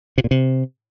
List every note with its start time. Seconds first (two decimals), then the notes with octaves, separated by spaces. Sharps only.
0.18 C3
0.24 A#2
0.31 C3